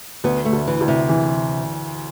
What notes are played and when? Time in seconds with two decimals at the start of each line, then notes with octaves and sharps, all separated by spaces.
0.24 D2 B3
0.45 A3
0.52 D2
0.67 E3
0.81 D2
0.88 C3
1.09 E3